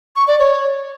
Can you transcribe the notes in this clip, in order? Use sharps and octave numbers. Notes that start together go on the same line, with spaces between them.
C#6
D5
C#5